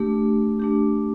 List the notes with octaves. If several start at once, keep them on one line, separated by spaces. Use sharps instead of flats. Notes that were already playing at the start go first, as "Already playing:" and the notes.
Already playing: A3 D4 G4
A3 D4 G4